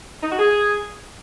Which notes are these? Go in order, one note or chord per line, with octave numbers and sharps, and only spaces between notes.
D#4
F#4
G#4